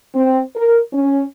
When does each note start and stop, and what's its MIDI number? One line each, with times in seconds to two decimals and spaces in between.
0.15 0.41 60
0.56 0.79 70
0.93 1.23 61